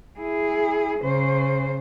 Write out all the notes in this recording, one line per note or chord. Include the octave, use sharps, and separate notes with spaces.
E4 G#4
C#3 C5